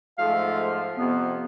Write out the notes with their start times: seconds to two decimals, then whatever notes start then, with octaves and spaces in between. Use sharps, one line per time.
0.18 G#2 F3 A3 F5
0.97 F2 C3 B3